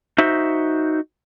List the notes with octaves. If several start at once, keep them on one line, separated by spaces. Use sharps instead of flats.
D#4 F#4 C5 E5